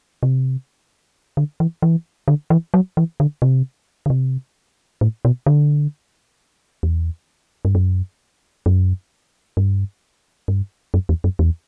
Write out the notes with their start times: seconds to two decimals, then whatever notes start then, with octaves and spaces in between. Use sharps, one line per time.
0.23 C3
1.37 D3
1.60 E3
1.82 E3
2.28 D3
2.50 E3
2.74 F#3
2.97 E3
3.20 D3
3.42 C3
4.06 D3
4.10 C3
5.01 A2
5.25 B2
5.46 D3
6.83 E2
7.65 G2
7.75 F#2
8.66 F#2
9.57 G2
10.48 G2
10.94 F#2
11.09 E2
11.24 F#2
11.39 E2